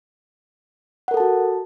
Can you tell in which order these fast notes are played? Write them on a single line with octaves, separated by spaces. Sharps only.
F#5 A#4 A4 A5 F#4